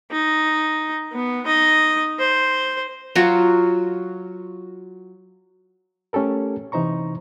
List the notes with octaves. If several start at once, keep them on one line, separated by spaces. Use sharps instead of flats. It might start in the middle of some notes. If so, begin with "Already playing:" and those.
D#4
B3
D#4 D#5
C5
F#3 F4 F#4
A3 C#4 G4 A4 A#4
C3 E3 D#4 C5 A#5 C#6